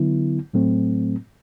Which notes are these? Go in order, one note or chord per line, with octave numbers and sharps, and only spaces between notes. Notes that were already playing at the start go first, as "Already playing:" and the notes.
Already playing: D3 F#3 B3 E4
A2 F#3 A3 C4